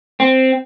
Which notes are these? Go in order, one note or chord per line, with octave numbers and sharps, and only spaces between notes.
C4